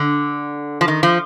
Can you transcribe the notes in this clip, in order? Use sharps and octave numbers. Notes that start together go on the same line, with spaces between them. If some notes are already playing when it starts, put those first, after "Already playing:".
Already playing: D3
F3
D#3
F3